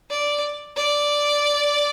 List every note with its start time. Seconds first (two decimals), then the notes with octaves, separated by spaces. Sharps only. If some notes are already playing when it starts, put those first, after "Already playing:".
0.10 D5
0.76 D5